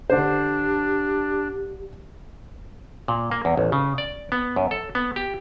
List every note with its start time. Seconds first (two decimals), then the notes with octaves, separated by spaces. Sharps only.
0.10 D3 D4 G4 C5
3.08 A#2
3.31 A#3
3.45 E2
3.57 A1
3.72 C#3
3.98 D5
4.32 B3
4.56 F#2
4.71 A4
4.95 B3
5.16 G4